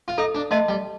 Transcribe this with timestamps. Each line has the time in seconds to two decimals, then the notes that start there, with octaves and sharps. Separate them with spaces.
0.08 F4
0.18 D#4 A4
0.35 D4
0.51 A3 D#5 A5 C6
0.68 G3